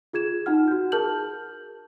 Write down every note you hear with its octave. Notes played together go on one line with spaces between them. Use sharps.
F4 G#4 G#6 E7
D#4 F4 F#5 F6
F#4 G6
G#4 A#4 A5 F6 G6 F#7